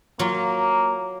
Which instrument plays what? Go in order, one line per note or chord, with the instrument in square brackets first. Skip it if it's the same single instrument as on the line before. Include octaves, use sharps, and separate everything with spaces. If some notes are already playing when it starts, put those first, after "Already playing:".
[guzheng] F#3 F4 C#5 [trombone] A#3